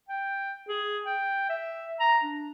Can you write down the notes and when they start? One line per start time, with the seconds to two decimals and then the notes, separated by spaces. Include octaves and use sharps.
0.09 G5
0.69 G#4
1.06 G5
1.49 E5
2.00 A#5
2.24 D4